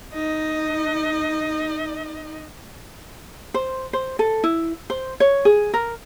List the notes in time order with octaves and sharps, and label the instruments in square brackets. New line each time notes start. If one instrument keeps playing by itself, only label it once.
[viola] D#4 D#5
[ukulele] C5
C5
A4
E4
C5
C#5
G#4
A#4